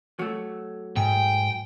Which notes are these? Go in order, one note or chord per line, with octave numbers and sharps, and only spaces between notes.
F#3 A3
G#2 G5 G#5